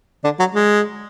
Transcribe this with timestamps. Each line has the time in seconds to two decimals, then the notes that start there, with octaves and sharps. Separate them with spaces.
0.24 D3 D4
0.39 F#3
0.54 G#3